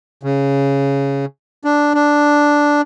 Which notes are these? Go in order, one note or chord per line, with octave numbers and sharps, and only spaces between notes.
C#3
D4
D4